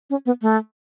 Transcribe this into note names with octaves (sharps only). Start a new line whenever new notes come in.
C#4
B3
A3